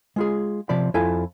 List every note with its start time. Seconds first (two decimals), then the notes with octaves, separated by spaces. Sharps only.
0.16 G#3 F4 G#4
0.69 C3 F3 D5 B5
0.94 F2 E4 F4 A4 F5 G#5